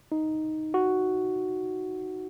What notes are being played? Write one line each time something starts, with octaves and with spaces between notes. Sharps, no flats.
D#4
F#4